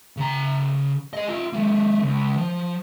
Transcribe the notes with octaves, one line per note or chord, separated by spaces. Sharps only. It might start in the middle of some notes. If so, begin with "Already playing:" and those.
C#3 A#5
G#4 D#5
F4 E5
G#3 A#3
C#2
F3